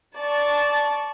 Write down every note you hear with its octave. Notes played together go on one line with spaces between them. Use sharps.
D5 A5 C#6